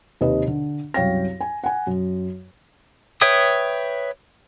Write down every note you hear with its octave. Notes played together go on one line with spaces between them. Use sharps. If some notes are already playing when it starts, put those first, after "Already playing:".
D#2 C3 B4 D#5
D3
C2 F#2 C#5 F5 G5 A#6
G#5
F#5 G#5
F#2
B4 C#5 E5 G5 D#6